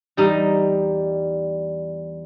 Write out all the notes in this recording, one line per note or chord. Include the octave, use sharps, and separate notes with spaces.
E2 G3 D#4